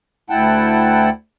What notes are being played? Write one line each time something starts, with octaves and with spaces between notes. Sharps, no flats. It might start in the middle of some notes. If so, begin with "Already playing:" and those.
D2 E4 F#5 G5 A5